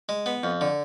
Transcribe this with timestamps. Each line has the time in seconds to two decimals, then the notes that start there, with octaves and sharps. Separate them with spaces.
0.09 G#3
0.26 B3
0.43 F2
0.61 D3